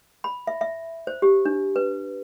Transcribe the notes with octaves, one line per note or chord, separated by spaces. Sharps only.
B5
E5
E5
C5
G4
D4
B4